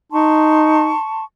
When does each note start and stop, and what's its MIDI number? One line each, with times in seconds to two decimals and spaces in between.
0.12 0.94 63
0.12 1.24 81
0.12 1.24 84
0.12 1.24 85